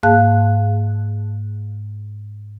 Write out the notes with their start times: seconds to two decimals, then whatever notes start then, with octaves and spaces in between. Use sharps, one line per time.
0.03 G#2 A#3 G#4 F5 A5 F#6